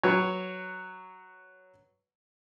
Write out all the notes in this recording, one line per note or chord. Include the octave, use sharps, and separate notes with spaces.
F#3 B4 C#5